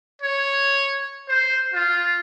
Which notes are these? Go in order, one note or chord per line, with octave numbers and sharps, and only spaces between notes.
C#5
C5
F4